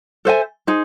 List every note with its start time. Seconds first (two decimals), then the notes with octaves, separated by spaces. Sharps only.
0.25 A4 C5 E5 G#5
0.67 D#4 G#4 C5